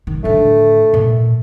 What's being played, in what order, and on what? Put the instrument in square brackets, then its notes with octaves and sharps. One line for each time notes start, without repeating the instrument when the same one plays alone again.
[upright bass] D#3
[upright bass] A2 D3 [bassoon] A3
[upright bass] A#2